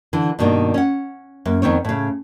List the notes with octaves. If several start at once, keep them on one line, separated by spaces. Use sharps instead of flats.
D3 E3
G2 B2 D#3 A#3 D4
C#4 F#5
F#2 A#3
F2 D#3 B3 C4 C#5
A2 C#3